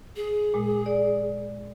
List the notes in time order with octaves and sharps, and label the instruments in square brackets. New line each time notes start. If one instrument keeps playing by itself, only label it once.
[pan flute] G#4
[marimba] A#2 G#3
D5